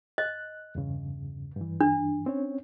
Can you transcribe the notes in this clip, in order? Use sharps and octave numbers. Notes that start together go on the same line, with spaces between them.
D#5 F#6
E2 G2 C#3
G2 E3
D4
C4 C#4 C#5